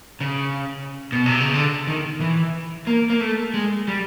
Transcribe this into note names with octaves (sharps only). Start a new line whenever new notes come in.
C#3
B2
C3
C#3
D3
D#3
E3
A#3
A#3
A3
G#3
G3